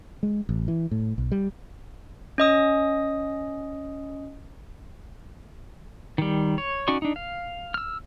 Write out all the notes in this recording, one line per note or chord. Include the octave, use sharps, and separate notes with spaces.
G#3
A1
E3
A2
B1
G3
C#4 D#5 D#6
D#3 G3
C#5
C#4 D#4 F#4 D5 C#6
D4 D#4
F5
E6 F6